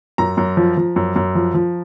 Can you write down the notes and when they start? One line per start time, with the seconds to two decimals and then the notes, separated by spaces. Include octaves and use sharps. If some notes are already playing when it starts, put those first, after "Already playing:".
0.18 F#2 A#5
0.37 F#2
0.57 F3
0.77 F3
0.96 F#2
1.16 F#2
1.35 F3
1.54 F3